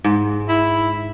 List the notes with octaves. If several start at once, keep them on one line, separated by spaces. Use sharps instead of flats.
G#2
E4